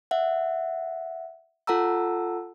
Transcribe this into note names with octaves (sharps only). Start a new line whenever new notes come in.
E5 F#5
F4 A4 F#5 A5 A#5 E6